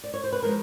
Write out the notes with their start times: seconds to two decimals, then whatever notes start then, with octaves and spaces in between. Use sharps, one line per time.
0.04 D5
0.14 C#5
0.24 C5
0.32 B4
0.43 F3 G#3 A#4